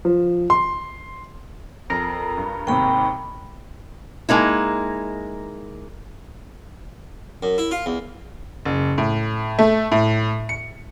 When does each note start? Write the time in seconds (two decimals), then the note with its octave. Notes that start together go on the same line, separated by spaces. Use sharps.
0.05 F3
0.50 C6
1.90 F2 A#4 A#5
2.37 G2
2.67 D#2 G#2 C3 G5 B5
4.29 G#3 A#3 D#4 E4
7.43 F#2
7.58 E4
7.71 F4
7.86 E2
8.65 F#1
8.98 A2
9.59 A3
9.92 A2
10.49 C#7